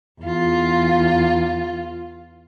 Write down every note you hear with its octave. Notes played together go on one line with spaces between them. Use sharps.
E2 F4